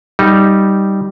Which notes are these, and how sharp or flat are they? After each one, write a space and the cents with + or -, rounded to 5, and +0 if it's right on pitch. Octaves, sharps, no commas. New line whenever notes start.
G3 -5 D#4 +0